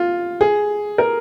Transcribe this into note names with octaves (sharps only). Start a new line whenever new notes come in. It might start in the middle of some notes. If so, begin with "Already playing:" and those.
Already playing: F4
G#4
A#4